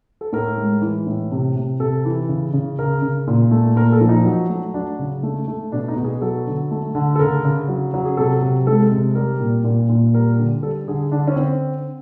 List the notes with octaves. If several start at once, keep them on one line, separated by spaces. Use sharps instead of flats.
A4
A2 A#4
G#3
E3
A2
C3
C3
C3 A4
E3
C#3
C#3
C#3 A#4
C#3
A#2
A3
A#2 A#4
A4
F3
D#4
F#3
A3
F#3 D4
C#3
A3
A3
B2 D4
D#4
B2
G#4
F#3 A4
D3
A3
D3
A4
C#3 A#4
C#3
F#3
F#3
G#4
C3 A4
C3
G#3 A4
C3
G3 A#4
A#2
A#2
A#2
G3 A#4
D3
G3 A4
D3 G#4
D3 D4
C#4
D3 C4